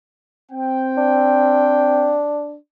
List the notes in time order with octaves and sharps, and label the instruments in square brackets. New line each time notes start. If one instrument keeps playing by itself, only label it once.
[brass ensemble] C4 G5
[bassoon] D4